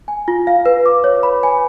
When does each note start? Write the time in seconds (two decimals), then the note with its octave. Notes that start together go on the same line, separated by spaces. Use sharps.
0.08 G#5
0.28 F4
0.47 F5
0.66 B4
0.86 D6
1.04 C#5
1.23 B5
1.43 G#5